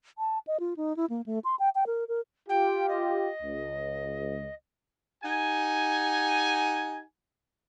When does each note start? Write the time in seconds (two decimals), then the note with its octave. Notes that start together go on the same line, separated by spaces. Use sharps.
0.18 A5
0.47 D#5
0.60 F4
0.77 D#4
0.97 E4
1.10 A#3
1.26 A3
1.44 C6
1.59 G5
1.75 G5
1.87 A#4
2.08 A#4
2.49 F4 G4 G5
2.89 D#5
3.42 C#2
5.24 D#4 G4 F#5 G#5